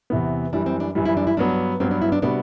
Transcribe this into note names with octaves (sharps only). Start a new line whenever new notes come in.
E2 C3 E3 B3
F#2 E3 G3 D4
C4
D4
F#2 E3 G3
E4
D4
E4
G2 F#3 B3 D4
G2 F#3 B3 C4
D4
E4
D4
C3 G3 B3 D4 F#4